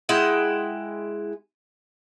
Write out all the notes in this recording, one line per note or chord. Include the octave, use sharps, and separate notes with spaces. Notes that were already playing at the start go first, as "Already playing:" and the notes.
G#3 E4 F#5 G5